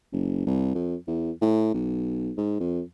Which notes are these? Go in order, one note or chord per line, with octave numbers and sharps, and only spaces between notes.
F#1
C2
F2
E2
A2
B1
G#2
F2